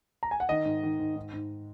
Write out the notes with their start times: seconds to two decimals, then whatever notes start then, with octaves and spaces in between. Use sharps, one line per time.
0.23 A#5
0.31 G#5
0.40 F#5
0.49 D#3 D#5
0.65 G#2
0.83 D#3
1.00 G#2
1.16 G#2
1.33 G#2